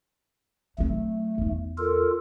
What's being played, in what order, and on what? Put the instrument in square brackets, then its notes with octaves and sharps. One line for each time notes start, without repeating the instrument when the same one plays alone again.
[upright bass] F#3 C4 [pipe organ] A3
[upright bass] E2 D#4
[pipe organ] F4 A4 A#4